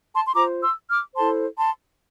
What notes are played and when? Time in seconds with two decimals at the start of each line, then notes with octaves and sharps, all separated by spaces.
0.14 A5 C6
0.27 C6
0.34 F4 C5 A#5 D6
0.62 C6 E6
0.90 D6 F6
1.17 E4 A4 C5 A5 C6
1.58 A5 C6